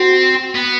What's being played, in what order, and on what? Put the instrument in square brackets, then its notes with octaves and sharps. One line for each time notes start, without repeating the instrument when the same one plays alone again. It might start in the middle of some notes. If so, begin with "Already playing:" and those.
Already playing: [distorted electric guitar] C4 [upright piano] F#4
[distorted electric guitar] B3